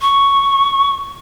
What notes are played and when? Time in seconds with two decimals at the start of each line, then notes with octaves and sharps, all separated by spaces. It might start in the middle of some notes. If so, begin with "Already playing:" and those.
0.01 C#6